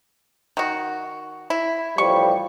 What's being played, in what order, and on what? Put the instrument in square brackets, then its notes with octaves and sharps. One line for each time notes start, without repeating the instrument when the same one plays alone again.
[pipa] D#3 F#4
E4
[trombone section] A1 F3 G3 [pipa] C#6